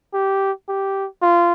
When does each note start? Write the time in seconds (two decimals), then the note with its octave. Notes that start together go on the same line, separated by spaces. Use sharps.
0.14 G4
0.69 G4
1.22 F4